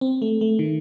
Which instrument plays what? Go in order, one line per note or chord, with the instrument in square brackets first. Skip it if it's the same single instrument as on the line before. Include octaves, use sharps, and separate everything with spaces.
[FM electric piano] C4
A3
A3
D#3